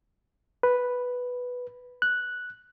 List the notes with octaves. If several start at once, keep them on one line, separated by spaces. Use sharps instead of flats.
B4
F#6